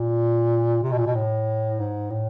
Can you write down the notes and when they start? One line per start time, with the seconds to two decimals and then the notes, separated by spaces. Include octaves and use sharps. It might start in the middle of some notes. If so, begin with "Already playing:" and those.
Already playing: A#2
0.83 C3
0.92 B2
0.98 A#2
1.06 B2
1.15 A2
1.80 G#2
2.10 A2